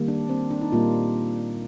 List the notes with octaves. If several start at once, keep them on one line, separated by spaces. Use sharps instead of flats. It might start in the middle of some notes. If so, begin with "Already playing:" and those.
Already playing: D#3 G3 A#3
D4
C4
D4
D#4
A#2 G3 A#3 F4